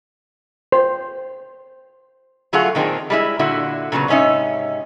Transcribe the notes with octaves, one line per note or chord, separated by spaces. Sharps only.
C5
D3 F#3 A3 F4 G#4 F#5
A#2 D#3 C4 D4 G#4
G3 G#3 E4
A#2 D3 E4 F#4
A#2 C#3 F#3 B3
G#2 C3 C#4 D#4 E5